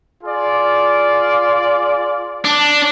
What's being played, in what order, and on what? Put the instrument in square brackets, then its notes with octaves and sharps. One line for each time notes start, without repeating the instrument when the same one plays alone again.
[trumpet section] F4 G#4 D5
[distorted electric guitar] D4